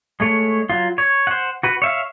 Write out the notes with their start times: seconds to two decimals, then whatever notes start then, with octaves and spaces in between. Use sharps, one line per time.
0.20 G#3 A3 C#5
0.69 F#3 F4
0.98 C#5
1.27 C5 F#5
1.63 F#4 B4
1.82 C#5 E5 F5